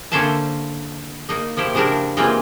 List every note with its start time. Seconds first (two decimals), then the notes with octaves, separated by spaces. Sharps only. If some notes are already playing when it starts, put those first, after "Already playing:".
0.12 D3 A#3 C#4 C5 E5 A5
1.29 A#3 D#4
1.57 F3 A#3 E4 G4
1.74 C#3 F3 G3 D4 E4 A#4
2.17 E3 G3 G#3 A#3 C4 F4